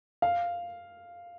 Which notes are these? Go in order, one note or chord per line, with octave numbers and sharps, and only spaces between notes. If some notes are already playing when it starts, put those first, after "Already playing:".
F5